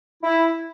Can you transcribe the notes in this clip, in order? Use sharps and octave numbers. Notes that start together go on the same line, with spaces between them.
E4